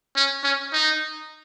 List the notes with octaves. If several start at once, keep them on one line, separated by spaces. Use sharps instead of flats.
C#4
C#4
D#4